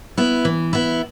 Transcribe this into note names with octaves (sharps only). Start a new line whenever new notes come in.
B3 E4
E3
B3 E4